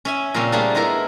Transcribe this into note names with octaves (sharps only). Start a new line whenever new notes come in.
C#4 E5 G#5
A#2 C#3 G3 C4 C#4
G3 A3 A#3 D4 F4 G#4
G#3 B3 E4 A#4 E5